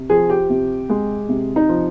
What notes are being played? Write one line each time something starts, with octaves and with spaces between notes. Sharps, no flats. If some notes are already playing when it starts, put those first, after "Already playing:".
Already playing: C3
F3 G#4
G4
C3
G#3
C3
D#4
F3